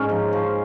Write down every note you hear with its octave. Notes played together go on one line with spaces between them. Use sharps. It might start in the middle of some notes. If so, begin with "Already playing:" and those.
Already playing: G#2 C#4
F3
F3